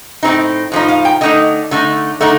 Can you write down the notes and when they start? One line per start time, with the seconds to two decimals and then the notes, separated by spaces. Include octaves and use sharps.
0.23 A2 F3 C4 D#4
0.72 A2 F3 D#4
0.88 F5
1.05 G5
1.21 D3 A3 D#4 D#5
1.71 D3 A3 D#4
2.20 D3 A3 D#4